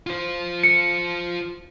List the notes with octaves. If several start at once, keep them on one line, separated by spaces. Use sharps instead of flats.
F4 C5
C#7